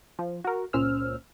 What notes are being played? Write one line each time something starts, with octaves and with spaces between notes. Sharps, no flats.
F3
F#4 A#4
C#2 A#2 C#4 C5 E6 F6